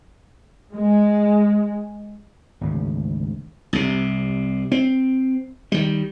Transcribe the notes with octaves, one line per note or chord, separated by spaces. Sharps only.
G#3
G#1 D2 C#3
C2 C3
C4
D#3 G3